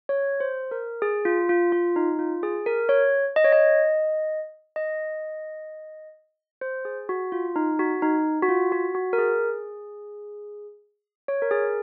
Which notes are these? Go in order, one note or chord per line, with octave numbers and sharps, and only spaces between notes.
C#5
C5
A#4
G#4
F4
F4
F4
D#4
F4
G#4
A#4
C#5
D#5
C#5
D#5
D#5
C5
G#4
F#4
F4
D#4
F#4
D#4
F#4
F4
F#4
F#4
A#4
G#4
C#5
A#4
G#4